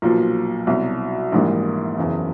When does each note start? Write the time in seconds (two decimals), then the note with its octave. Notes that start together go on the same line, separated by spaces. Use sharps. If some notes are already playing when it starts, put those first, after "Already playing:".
0.02 B1 A#2 F3
0.67 C2 B2 F#3
1.32 A#1 G#2 E3 G3 A#3
1.98 F#1 E2 C#3